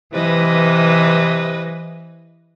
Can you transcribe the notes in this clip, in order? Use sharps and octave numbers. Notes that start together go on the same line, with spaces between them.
C3 E3 B4 D#5